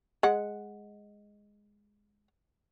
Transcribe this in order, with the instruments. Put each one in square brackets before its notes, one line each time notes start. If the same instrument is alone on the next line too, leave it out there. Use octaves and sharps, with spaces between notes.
[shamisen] G#3 F#5